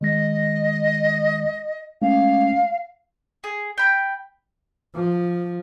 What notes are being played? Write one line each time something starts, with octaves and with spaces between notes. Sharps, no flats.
D#3 G#3 D#5 A#6
G#3 A3 C#4 F5
G#4
G5 B5
F3